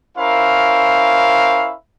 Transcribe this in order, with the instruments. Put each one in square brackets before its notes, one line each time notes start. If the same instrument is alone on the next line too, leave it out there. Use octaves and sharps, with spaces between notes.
[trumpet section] C#4 E4 A#4 C5 F5